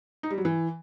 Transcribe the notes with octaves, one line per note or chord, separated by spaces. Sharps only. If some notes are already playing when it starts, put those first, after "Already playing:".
D#4
G3
F#3
E3